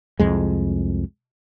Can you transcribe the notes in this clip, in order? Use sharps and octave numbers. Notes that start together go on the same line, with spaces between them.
C2 F2 G#3